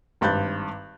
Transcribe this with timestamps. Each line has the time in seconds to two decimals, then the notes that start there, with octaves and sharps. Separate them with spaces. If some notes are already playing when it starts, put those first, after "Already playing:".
0.21 G#1 G2 B5 F#6 G6 A6